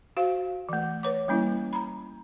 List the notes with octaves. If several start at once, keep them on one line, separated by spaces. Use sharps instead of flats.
F#4 C5 F5
E3 A3
B4 C#5 D6
G3 A#3 C#4 E4
A#5 B5